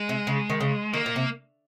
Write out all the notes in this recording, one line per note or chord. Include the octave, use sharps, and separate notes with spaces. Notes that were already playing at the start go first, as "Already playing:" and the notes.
Already playing: G#3
C3
C#3
D#3
C#3
D#3 A#3
A#2
C3